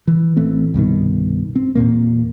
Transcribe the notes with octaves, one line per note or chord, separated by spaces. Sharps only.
E3
A1 E3 A3 C4
C2 G2 B2 D#3
C4
E2 G2 A#2 A#3